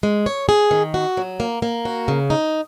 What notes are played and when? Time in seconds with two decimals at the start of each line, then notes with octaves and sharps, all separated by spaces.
0.03 G#3
0.26 C#5
0.49 G#4
0.71 D#3
0.94 F#4
1.17 F#3
1.40 A#3
1.62 A#3
1.85 F#4
2.08 C#3
2.30 D#4